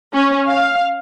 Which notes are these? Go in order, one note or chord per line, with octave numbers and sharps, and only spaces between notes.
C#4
F5